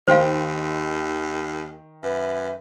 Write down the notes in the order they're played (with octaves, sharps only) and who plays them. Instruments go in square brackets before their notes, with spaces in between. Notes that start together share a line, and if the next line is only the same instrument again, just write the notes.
[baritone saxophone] D#2 [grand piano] D#3 G5 C6 [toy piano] C5 F5
[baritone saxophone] F#2 [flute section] B4 E5